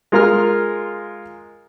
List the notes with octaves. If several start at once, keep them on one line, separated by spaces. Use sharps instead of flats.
G#3 F4 A#4 A#5 F6